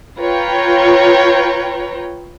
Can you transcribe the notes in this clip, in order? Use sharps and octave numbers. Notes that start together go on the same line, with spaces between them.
F4 B4 C#5 G5 A#5